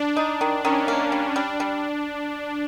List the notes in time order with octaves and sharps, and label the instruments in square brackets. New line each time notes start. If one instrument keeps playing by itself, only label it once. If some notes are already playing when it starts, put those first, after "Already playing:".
Already playing: [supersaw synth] D4
[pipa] D#4
D#3
[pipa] D#3 [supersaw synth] C#4
[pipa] A#3
G3
[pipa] G3 [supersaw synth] D4
[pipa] G3